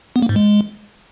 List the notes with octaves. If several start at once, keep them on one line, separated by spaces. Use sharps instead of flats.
B3
A#3
G#2
G#3